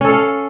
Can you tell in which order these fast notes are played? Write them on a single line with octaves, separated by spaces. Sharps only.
C#4 A4 F5